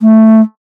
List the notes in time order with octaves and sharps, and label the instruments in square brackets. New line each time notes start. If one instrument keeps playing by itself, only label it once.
[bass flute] A3